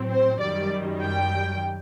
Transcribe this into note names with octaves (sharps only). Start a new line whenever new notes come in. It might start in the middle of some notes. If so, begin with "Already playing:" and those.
Already playing: A2 F#3 C4
C5
F#2 D#3 G3 D5
G5